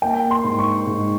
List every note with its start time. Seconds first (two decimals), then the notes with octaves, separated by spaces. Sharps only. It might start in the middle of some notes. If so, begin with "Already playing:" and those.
0.02 A#3 G5
0.31 C6
0.44 G#2
0.59 C#6
0.87 G#2